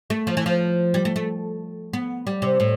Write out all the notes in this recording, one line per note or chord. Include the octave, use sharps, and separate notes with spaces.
A3
F3
E3
F3
G3
A3
A3
B3
G3
C3
A2